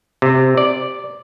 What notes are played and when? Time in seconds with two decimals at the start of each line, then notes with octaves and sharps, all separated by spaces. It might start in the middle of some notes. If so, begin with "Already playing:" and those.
0.22 C3
0.57 D5